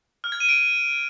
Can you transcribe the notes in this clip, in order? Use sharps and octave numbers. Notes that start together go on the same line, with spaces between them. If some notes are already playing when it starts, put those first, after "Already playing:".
F6
G#6
D#7
D7